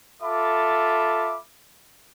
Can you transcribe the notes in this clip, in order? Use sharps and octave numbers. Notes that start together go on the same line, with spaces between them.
F4 A4 E5 B5 D6